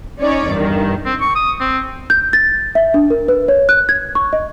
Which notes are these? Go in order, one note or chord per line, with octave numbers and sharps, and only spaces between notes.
C#4 D#4 C#5 D5
E2 G2 D#3
C4
C#6
D#6
C4
G6
A6
E5
D4
A#4
B4
C#5
F#6
G#6
C#6
D#5